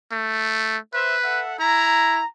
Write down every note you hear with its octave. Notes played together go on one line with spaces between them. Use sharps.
A3
B4 C5 E5
A4 E5 F#5
E4 A#5